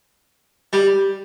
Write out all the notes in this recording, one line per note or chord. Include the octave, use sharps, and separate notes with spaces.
G3